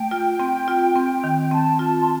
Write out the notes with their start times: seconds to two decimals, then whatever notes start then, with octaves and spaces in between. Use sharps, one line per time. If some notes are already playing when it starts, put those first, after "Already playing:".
Already playing: A3 G5
0.11 F4
0.40 C4
0.68 F4
0.96 C4
1.24 D#3
1.41 G5
1.51 C4 A5
1.79 F4 A5
2.01 C6